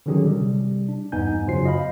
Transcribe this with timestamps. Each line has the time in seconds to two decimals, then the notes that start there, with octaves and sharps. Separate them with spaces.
0.06 D3 D#3 F#3 C#4 G4 G#4
0.25 C3 G3
0.88 D4
1.12 E2 G2 B3 D#4 G#5 G6
1.46 F#2 C#3 F#3 F4 C5 C7
1.65 D#5 F5 B5